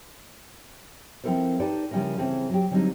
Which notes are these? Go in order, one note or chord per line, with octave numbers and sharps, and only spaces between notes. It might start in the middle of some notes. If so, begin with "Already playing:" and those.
F3 C4 E4 A4 A#4 C5
D#4 G4 A4 B4 D5
C#3 F3 G3 C#4 E4 A#4
C#3 E3 C4 C#4 G#4 A4
F#3 G4
D3 F#3 G3 C4 D4 D#4